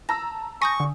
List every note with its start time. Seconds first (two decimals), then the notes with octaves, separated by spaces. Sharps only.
0.09 A5 A#5 E6 A#6
0.62 G#5 C#6 D#6 G6 A#6
0.80 D3